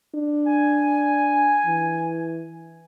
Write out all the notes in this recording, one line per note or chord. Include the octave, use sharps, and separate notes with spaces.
D4
G#5
E3